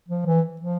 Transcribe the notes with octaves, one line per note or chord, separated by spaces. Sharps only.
F3
E3
F3